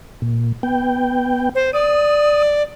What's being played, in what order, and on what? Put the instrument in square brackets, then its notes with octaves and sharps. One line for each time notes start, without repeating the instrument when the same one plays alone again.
[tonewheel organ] A#2
B3 G5
[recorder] C5
[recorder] D5 [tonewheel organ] D#6